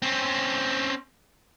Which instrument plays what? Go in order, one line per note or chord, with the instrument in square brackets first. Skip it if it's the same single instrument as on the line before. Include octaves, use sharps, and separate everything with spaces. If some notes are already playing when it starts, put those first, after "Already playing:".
[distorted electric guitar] C4 C#4